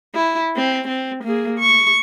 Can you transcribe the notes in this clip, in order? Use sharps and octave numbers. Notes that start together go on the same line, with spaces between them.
E4
C4
C4
A#3 G#4
C#6